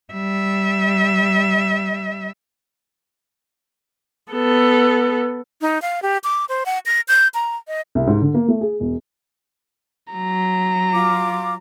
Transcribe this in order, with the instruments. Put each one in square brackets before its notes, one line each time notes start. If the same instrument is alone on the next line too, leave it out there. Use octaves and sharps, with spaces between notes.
[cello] G3 E5
[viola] B3 A4
[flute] D#4
F5
G4
D6
C5
F#5
A#6
G6
A#5
D#5
[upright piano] C2
G#2
D3
A#3
A3
G#4
E1
[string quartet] F#3 [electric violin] A#5
[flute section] F4 D6